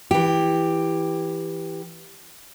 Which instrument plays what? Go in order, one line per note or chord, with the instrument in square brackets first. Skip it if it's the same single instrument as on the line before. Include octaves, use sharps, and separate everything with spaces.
[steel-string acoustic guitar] E3 G4